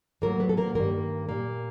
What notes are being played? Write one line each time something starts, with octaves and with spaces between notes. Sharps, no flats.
A2 F#3 A3 A#3 A#4
B3 B4
A4
A#3 A#4
G2 D#3 G3 A#3 A#4
A#2 G3 A#3